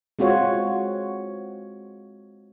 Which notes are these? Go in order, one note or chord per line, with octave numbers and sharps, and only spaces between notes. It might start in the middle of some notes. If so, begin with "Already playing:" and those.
G#3 C4 F4 F#4 C#5